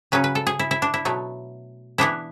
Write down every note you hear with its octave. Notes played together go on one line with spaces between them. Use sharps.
C#3 F#3 C#4 B4
B4
A4
G#4
E4
E4
D4
E4
B2 F#3 A3
E3 B3 D4 E4